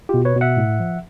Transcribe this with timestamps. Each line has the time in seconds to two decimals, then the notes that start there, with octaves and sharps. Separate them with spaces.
0.09 B2 F4 G4
0.25 B4 C#5
0.36 B2
0.41 E5 F#5
0.57 A2
0.80 F3